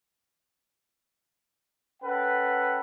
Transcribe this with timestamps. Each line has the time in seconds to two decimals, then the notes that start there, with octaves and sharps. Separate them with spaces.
2.03 C#4 A4 B4 F#5 G5